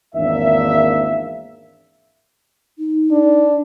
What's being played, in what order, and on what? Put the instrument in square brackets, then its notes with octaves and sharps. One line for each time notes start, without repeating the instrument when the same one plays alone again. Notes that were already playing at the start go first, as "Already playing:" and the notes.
[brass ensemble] G#1 E2 A#3 D4 E5
[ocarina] D#4
[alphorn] D4